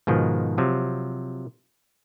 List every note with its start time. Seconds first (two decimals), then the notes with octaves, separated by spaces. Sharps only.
0.07 G#2 B2 D#3 F3
0.58 C3 F3 F#3